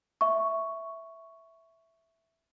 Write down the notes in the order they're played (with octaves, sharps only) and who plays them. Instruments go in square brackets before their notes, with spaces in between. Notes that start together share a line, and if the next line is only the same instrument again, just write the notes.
[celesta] E5 C#6